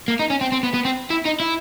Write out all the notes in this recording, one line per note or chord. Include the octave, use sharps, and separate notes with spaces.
A#3
D#4
C#4
C4
C4
B3
B3
C4
E4
D#4
E4